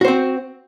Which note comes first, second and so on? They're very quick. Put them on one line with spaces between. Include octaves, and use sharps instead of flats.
F#4 C5 C4